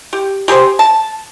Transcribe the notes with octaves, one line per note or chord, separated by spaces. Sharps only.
G4
G4 G#4 A#4 C5
A5